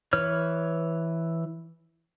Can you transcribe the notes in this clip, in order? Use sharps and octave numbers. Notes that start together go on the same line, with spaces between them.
E3 B4 C#5 F6